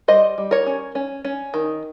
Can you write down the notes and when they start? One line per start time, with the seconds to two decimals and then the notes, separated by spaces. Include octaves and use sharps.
0.08 G3 C5 D#5
0.38 G3
0.51 A#4 C#5
0.67 C#4
0.95 C#4
1.25 C#4
1.54 D#3